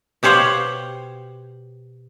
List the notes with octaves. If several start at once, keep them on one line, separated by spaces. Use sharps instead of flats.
B2 G4 C5 C#5 F5 F#5